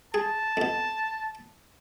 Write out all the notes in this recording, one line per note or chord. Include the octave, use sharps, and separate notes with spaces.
G#4 A5
F2 B2